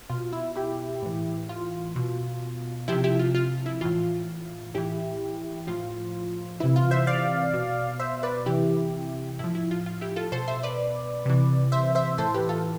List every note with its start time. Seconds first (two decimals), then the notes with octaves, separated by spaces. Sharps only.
0.10 B2 F4
0.33 E4
0.56 E4 G4
1.02 A2 E3
1.49 F4
1.96 B2
2.88 C3 F3 E4 G4
3.04 E4 G4
3.19 F4
3.34 F4
3.66 E4
3.81 A2 E3 F4
4.74 A2 E3 E4 G4
5.67 A2 F3 F4
6.60 C3 E3 E4
6.76 F4
6.91 C5 E5
7.07 D5 F5
7.53 B2
7.99 C5 E5
8.23 B4 D5
8.46 C3 E3 E4 G4
9.39 A2 F3 E4
9.55 E4
9.71 F4
9.86 F4
10.01 E4 G4
10.16 F4 A4
10.32 B2 A4 C5
10.48 C5 E5
10.63 B4 D5
11.26 C3 E3
11.72 C5 E5
11.95 C5 E5
12.18 A2 E3 A4 C5
12.34 G4 B4
12.49 F4 A4